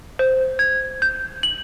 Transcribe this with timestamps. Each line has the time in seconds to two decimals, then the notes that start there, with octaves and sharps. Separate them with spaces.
0.19 C5
0.59 G#6
1.02 G6
1.43 F#7